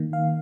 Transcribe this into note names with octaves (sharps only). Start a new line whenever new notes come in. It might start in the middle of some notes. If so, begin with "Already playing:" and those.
Already playing: D#3 A#3
F5